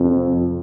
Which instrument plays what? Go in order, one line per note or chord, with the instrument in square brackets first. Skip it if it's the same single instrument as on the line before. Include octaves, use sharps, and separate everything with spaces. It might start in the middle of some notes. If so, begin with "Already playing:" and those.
Already playing: [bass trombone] F2 [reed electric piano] C3 C4 F4